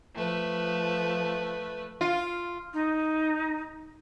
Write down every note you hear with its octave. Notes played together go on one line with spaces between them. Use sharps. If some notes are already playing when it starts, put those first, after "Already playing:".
F3 A3 B4
F4
D#4